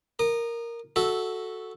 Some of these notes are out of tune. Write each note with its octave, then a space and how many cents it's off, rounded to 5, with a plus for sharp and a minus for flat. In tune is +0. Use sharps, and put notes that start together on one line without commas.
A#4 +0 D#6 -30
F#4 +0 A4 +0 E5 -10